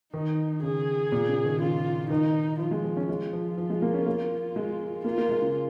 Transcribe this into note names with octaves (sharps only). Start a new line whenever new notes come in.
D#3 D#4
C#3 G#4
A#2
C#3
D#3
C#3 F4
D#3 D#4
F3 F4
G#3
F3
C#4
G#3 F4
F3
F3
G#3
A#3
C#4
A#3
G#3
A#3 F4
A#3
G#3
C#3